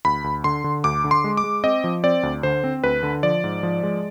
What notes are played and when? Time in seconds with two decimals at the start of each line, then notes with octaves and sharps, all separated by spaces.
0.05 D2 B5
0.24 D2
0.44 D3 C6
0.64 D3
0.84 D2 D6
1.04 D3
1.11 C6
1.24 G#3
1.37 D6
1.44 G#3
1.64 C4 D#5
1.84 F3
2.04 C4 D5
2.23 D2
2.43 D3 C5
2.64 C4
2.84 D2 B4
3.03 D3
3.23 F3 D5
3.44 G#2
3.63 F3
3.83 G#3